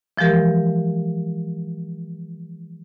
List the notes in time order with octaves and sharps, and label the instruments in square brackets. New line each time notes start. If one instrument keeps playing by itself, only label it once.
[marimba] E3 F3 G#3 G4 A#4